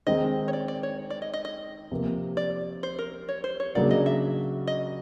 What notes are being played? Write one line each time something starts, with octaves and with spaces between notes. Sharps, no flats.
D#3 G#3 C4 D#4 D#5
C#5
D5
D5
C#5
D5
D#5
D#5
D#5
C3 F3 A#3
D5
C5
A#4
C#5
C5
C#5
C#3 F#3 A#3 D4 F#4 D5
D#5
E5
D#5